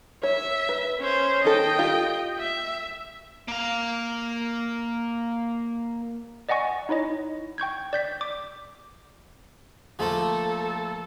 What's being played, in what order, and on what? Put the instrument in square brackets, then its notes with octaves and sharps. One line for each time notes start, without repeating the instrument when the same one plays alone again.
[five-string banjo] C#5 [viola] E5
[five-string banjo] B4
[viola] C#4 C5
[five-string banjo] D#3 A4 [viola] D#5 G5
[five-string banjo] F4 G4
[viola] E5
[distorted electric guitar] A#3 F5
[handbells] D5 D#5 F#5 G#5 C#6
D#4 E4 C#5 D#5
G5 C#6 G6 G#6
D5 G6 B6
D6
[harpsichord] F3 A3 A#3 [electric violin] A4